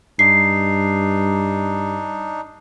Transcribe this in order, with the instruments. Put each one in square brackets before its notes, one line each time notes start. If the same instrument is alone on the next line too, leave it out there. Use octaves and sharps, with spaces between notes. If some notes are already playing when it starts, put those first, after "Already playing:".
[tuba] G2 [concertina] D4 D#4 [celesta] C7